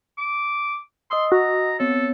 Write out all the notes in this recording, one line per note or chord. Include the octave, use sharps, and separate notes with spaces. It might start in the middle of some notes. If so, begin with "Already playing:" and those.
D6
D#5 C6 D#6 E6
F#4 A#5
B3 C4 A4 C#5